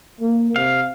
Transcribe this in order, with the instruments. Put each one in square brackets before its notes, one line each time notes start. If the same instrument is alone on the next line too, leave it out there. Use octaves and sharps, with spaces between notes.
[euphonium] A#3
[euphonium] C3 [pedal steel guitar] F5